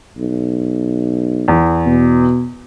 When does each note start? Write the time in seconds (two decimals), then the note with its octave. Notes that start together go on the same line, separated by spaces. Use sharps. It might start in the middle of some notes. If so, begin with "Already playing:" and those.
0.17 B1
1.48 E2
1.86 B2